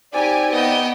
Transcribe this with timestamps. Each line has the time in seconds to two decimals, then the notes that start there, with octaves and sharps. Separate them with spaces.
0.13 C4 D#4 G4 D5 G#5
0.52 B3 D#5 G5